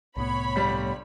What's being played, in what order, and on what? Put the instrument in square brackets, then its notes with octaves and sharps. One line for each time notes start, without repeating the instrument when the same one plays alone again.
[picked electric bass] C2 A2 B3 [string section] C#5 B5
[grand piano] G1 G3 B6